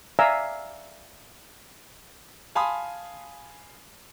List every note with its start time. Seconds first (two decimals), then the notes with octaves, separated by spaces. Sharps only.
0.19 D5 E5 F5 G#5 A#5 E6
2.55 F5 G#5 A5 B5 C6 D#6